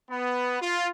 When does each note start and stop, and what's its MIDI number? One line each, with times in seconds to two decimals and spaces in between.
0.10 0.56 59
0.61 0.88 65